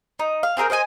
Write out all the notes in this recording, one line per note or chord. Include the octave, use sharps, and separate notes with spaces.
D#4
F5
C4 G#4 A#4 G5
C5 D#5 F#5 G#5